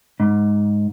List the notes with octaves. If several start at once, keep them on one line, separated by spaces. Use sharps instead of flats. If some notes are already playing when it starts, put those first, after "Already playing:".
G#2